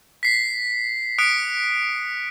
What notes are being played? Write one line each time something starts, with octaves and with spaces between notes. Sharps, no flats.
B6 C7
D#6 F#6 B6 C#7 D7